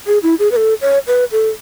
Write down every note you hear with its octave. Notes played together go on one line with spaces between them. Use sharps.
G#4
E4
G#4
B4
A4
C#5
B4
A4